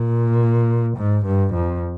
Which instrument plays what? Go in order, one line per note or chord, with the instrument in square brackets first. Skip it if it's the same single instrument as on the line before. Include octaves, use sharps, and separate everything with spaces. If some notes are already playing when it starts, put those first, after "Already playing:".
Already playing: [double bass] A#2
G#2
G2
F2